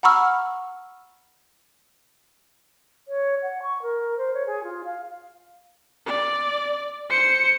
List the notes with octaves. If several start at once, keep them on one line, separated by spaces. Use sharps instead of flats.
F#5 A#5 B5 C#6 E6 F6
C#5
F#5
C#6
A#4
C5
C#5
G#4
F4
F5
D5
C5 C#7